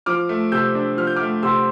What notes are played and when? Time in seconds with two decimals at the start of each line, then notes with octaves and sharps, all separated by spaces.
0.06 F3 D6 F6
0.29 A3
0.52 C3 E6 G6
0.75 D4
0.97 F3 F6
1.07 G6
1.16 A3 D6 F6
1.43 C3 C6 E6